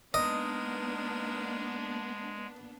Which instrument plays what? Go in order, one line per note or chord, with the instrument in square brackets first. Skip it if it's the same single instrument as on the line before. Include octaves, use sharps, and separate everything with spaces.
[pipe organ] G#3 [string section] A#3 B3 D4 [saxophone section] D#4 A#4 B4 [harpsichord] D#5